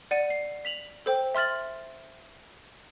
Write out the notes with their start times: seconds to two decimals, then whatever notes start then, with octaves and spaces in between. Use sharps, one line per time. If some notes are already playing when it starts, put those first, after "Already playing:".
0.11 D5 F#5 D#7
0.30 C7
0.65 B6 F7 F#7
1.06 A4 C5 G5
1.35 E5 C6 F6 A6 F#7